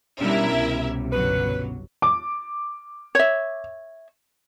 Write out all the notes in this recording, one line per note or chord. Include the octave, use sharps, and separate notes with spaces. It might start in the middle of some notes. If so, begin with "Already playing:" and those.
B2 G3 C#4 D4 E4 G4 A#4 E5
C2
G1 F#3 B4
D6
C#5 E5